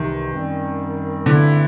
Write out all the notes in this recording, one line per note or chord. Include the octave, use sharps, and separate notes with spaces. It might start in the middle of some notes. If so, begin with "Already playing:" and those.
Already playing: C2 C3 D#3 E3
F#2 D#3 G3 C4
G2 D3 E3 A3 C4 E4